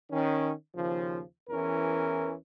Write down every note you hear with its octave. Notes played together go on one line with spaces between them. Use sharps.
D#3 C#4
D#2 C#3 F3
E2 E3 C#4 A#4